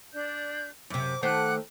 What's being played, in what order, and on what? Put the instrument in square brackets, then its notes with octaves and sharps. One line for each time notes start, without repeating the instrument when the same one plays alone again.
[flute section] D4 D5 G6
[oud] F#2 C3 [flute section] D6
[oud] D#3 A3 C5 [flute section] F#5 D6 F#6